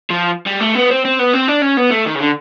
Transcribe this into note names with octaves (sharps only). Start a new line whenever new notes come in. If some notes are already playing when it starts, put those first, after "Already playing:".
F3
G3
A3
B3
C4
C4
B3
C4
D4
C#4
B3
A3
D#3
C#3
D3